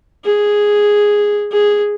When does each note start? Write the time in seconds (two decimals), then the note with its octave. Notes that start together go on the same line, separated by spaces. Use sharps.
0.25 G#4
1.52 G#4